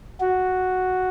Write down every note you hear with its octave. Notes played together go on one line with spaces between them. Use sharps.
F#4